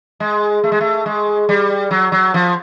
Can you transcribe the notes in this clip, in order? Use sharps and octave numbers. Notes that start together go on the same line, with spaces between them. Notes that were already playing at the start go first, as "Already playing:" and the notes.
G#3
A3
G#3
A3
G#3
G3
F#3
F#3
F3